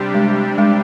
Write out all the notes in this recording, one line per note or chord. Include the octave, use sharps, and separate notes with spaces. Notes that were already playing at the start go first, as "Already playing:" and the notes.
Already playing: C3 G3 D4 G4
G#3
G#3